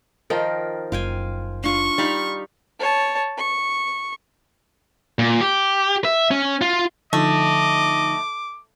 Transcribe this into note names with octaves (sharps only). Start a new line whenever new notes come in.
D#3 F3 A#4 G5
F#1 F4 G5 G#5
D4 F4 C#6
G3 D#4 F5 B5
C#5 A5
C#6
A#2
G4
E5
C#4
F4
D3 F3 A3 D#4 D#5 D6